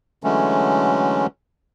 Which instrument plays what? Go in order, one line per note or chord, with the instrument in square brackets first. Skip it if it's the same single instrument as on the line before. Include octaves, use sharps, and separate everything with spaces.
[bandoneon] D3 E3 F#3 G#3 A3 C#4